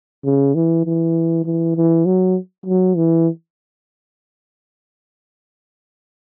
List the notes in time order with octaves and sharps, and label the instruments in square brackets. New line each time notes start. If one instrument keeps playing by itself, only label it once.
[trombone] C#3
E3
E3
E3
E3
F#3
F#3
E3